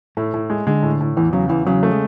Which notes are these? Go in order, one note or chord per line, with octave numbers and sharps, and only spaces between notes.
A2 A3
A2
G#3
D3 G#3
A2
A2
E2 E3
C#3 F#3
E2 E3
C#3 F#3
A3
G#3